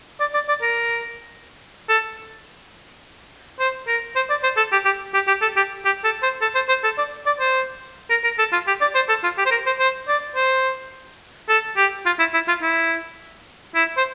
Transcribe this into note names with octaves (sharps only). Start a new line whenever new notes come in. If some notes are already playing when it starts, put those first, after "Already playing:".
D5
D5
D5
A#4
A4
C5
A#4
C5
D5
C5
A4
G4
G4
G4
G4
A4
G4
G4
A4
C5
A4
C5
C5
A4
D5
D5
C5
A#4
A#4
A4
F4
G4
D5
C5
A4
F4
G4
C5
A#4
C5
C5
D5
C5
A4
G4
F4
E4
E4
F4
E4
E4
C5